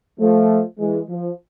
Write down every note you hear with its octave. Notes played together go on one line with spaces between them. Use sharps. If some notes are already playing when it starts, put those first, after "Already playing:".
F3 A3
E3 G#3
F3